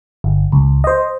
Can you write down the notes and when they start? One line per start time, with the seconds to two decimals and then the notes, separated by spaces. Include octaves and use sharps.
0.24 G1
0.52 C#2
0.84 C5 D#5